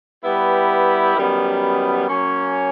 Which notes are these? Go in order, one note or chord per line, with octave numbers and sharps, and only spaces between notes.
G3 B3 E4 G4 B4
F#2 D#3 G3 B3
F#3 A#3 C#4